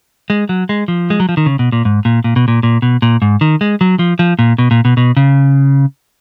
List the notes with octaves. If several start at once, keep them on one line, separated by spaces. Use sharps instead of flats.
G#3
F#3
G#3
F3
G#3
F#3
F3
D#3
C#3
B2
A#2
G#2
A#2
A#2
B2
A#2
A#2
B2
A#2
G#2
D#3
G#3
F#3
F3
F3
A#2
B2
A#2
B2
B2
C#3